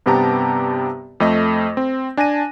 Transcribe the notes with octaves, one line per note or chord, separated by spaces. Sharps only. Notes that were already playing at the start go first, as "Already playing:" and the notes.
G2 C3 B3 G4 A5 A#5
F2 A3 D#5 A#6
C4
D4 G#5 A5 A#6 D#7